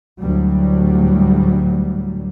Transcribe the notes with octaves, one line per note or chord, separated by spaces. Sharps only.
D2 A2 F#3 G3